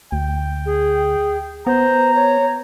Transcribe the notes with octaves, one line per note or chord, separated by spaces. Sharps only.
D2 G5
G#4
B3 C5 A#5
C#5